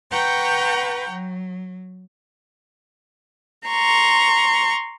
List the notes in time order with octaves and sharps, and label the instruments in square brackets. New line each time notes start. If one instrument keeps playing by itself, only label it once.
[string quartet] B4 F#5 G5 A#5 C#6 G6
F#3
A#5 C6 C#6